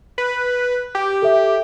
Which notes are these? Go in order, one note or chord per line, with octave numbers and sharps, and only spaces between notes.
B4
G4
A4 E5